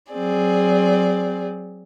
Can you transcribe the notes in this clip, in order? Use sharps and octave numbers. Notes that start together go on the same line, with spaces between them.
F#3 C4 G#4 D5